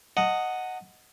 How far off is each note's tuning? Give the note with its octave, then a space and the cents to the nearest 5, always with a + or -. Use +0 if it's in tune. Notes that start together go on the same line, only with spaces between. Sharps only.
D#5 +0 F#5 +0 A5 +35